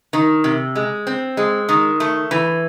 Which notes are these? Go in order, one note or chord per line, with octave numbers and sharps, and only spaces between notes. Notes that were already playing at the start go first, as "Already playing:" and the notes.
D#3
C3
G#3
C4
G#3
D#3
A3
E3